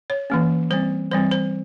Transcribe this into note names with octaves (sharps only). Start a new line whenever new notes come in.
C#5
E3 A#3 C#4
G3 C4 C5
E3 G3 C4 C5
C5